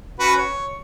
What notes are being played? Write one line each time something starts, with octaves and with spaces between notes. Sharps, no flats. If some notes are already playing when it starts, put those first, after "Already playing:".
C#4 F#4 B4
C#5